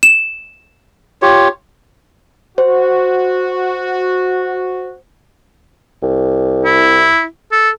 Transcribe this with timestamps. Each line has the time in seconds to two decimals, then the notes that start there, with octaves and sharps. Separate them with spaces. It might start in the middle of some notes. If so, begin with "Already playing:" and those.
0.03 E7
1.22 F4 G4 C#5
2.58 F#4 C5
6.03 C2
6.65 E4
7.52 A4